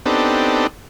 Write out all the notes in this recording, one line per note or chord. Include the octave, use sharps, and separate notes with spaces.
B3 C4 D4 D#4 G4 A4